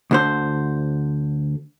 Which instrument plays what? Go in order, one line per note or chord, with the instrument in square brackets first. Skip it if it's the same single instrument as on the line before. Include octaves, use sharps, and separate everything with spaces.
[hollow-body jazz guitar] D2 D3 C5